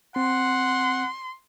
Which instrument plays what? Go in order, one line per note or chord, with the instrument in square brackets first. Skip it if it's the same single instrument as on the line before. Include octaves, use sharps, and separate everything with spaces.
[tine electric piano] C4 [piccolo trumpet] F#5 [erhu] C6